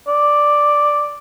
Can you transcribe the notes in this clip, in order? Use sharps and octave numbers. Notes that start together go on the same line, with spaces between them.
D5